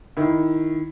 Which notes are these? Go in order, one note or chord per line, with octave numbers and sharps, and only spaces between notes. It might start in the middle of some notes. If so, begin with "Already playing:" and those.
D#3 E4